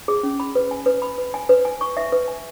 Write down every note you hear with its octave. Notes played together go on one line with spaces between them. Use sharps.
G#4
C#4
B5
B4
G#5
B4
B5
B4
G#5
B4
G#5
C#6
E5
B4
G#5